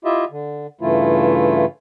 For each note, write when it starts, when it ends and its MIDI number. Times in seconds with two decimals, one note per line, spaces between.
0.05 0.25 64
0.05 0.25 65
0.05 0.25 67
0.05 0.25 75
0.05 0.25 76
0.31 0.67 50
0.81 1.65 43
0.81 1.65 49
0.81 1.65 52
0.81 1.65 57
0.81 1.65 64
0.81 1.65 65